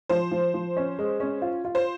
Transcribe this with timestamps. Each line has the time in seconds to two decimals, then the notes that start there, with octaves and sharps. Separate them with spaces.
0.09 F3 C5
0.31 F3
0.54 F3
0.77 C#4
0.99 G#3
1.20 C#4
1.42 F4
1.65 F4
1.75 C5